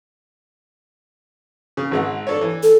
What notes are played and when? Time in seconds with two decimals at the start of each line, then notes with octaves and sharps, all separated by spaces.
1.77 C#3
1.91 G#1 G#3 F#5
2.27 D4 A4 C#5
2.41 E3
2.63 A4